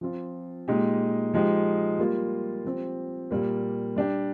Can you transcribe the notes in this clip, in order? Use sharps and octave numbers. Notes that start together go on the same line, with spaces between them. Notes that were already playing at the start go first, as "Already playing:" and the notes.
F3 C4 F4
A#2 G#3 D#4 G4
F3 G#3 D#4 G4
G3 A#3 F4
F3 C4 G4
A#2 G3 A#3
G3 D4 G4